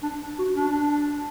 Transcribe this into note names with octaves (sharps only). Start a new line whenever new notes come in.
D4
F#4
D4